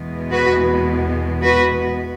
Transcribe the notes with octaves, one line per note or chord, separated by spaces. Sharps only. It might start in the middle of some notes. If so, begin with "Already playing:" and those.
Already playing: E2 B2 G#3 B3
F#4 B4
F#4 B4